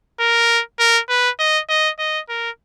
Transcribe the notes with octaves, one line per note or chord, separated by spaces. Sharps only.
A#4
A#4
B4
D#5
D#5
D#5
A#4